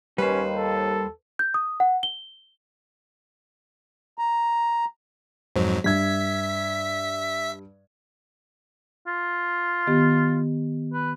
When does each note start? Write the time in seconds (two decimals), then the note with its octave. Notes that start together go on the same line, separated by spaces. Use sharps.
0.18 D#2 G3 C#4 B4 C5
0.56 A4
1.39 G6
1.54 D#6
1.80 F#5
2.03 G7
4.18 A#5
5.56 F2 G#2 F#3 C5
5.84 G2 E5 G#6 B6
9.07 F4
9.87 D#3 B3 G4
10.93 B4